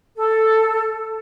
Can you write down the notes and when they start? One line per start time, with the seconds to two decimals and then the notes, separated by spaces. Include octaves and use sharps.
0.17 A4